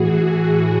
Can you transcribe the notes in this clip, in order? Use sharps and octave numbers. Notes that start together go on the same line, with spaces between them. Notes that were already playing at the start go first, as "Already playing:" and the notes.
Already playing: A2 E3 F#4 G#4
G#4